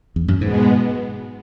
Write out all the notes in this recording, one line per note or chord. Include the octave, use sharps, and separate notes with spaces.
E2
F#2
G#2 B2 G#3 B3